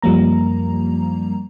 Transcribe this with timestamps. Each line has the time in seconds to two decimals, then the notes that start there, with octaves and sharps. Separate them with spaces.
0.02 F#2 F3 G3 A#3 A#5